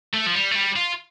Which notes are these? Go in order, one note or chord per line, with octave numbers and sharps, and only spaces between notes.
A3
F3
G3
A3
G3
F4